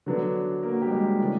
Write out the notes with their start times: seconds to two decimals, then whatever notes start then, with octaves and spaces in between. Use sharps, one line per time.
0.06 D3 F#3 B3 D4
0.63 A#3 A#4
0.73 F#4
0.82 G3 G4
0.91 G#3 G#4
1.20 C#3 E3 A3 D4